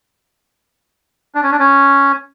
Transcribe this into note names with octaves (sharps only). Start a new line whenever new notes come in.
D4
C#4
D4
C#4